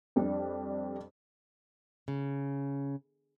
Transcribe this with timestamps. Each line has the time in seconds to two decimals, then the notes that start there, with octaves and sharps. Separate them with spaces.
0.16 F2 G3 D4
2.08 C#3